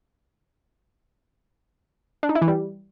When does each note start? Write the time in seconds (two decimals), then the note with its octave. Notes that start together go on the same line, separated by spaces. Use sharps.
2.23 D4
2.29 D#4
2.35 E4
2.42 E3
2.48 G3